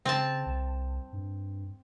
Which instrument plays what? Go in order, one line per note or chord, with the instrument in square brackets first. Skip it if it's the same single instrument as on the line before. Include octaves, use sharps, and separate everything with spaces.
[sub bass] C#3 [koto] C4 A5
[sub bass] C2
G2